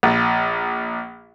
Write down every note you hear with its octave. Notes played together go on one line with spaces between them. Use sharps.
A#1